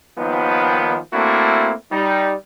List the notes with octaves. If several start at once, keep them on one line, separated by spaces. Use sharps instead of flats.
D#2 D#3 F3 G3 B3
A3 A#3 C4 D4 E4 F#4
G3 D#4